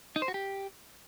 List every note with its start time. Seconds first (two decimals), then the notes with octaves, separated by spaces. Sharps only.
0.16 D#4
0.22 C5
0.28 F#4
0.34 G4